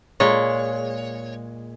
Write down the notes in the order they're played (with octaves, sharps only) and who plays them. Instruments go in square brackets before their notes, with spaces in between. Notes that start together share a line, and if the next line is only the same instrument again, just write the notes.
[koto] A#2 G#3 [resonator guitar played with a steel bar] C#5